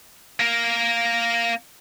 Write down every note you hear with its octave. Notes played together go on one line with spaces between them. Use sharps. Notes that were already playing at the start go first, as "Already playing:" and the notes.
A#3 A#4